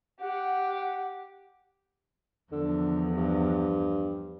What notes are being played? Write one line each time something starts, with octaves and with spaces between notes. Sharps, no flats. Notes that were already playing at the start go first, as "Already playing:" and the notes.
G4 F#5
E2 D3 F3
G2